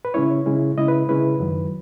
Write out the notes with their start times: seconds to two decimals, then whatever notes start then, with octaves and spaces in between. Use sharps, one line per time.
0.05 B4
0.14 C#3 G#3 C#4 E4 C#5
0.46 C#3 G#3 C#4 E4
0.78 C#3 G#3 C#4 E4 D#5
0.88 B4
1.09 C#3 G#3 C#4 E4 B4
1.40 F#2 D#3 F#3